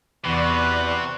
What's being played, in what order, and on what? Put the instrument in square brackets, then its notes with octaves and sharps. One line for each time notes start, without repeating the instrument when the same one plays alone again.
[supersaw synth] E2 D5 [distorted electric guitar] C3 [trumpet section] F#4 B4